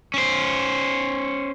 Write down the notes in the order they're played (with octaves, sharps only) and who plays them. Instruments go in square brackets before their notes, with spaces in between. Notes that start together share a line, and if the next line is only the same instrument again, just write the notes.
[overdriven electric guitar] C#4 C5